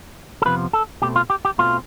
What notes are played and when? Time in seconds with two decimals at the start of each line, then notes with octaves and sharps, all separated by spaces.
0.42 A4
0.45 F2 C3 F3 B3 F4 B4
0.73 A4
1.02 B2 A3 C4 G4
1.16 F4
1.30 G4
1.45 G4
1.58 B2 A3 C4 F4